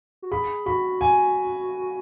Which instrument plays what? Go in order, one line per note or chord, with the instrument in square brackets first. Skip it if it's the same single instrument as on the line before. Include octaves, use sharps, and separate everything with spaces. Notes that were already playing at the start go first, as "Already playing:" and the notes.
[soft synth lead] F#4
[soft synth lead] G#4 [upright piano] B5
[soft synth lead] F#4 [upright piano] B5
[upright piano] G#5